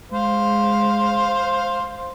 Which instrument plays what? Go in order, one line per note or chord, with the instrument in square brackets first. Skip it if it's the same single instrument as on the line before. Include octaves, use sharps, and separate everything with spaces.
[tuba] G#3 [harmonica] C5 F5